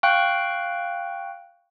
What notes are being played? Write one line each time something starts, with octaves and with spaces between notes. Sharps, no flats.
F5 G5 C#6 F#6